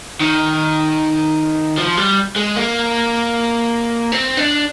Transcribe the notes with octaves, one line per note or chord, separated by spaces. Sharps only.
D#3
F3
G3
G#3
A#3
C4
D4